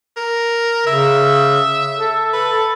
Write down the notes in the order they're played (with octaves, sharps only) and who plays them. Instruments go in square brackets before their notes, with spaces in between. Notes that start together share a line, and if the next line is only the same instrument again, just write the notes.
[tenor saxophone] A#4
[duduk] C#3 [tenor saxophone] E5
[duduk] A4
[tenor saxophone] B4